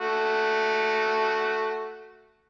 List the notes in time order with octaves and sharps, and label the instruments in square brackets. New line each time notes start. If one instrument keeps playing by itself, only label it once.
[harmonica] A3 F#4